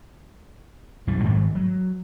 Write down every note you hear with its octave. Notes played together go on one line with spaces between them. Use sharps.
B1 F#2 E3 G3
G#2 D#3 G#3 A3
F#3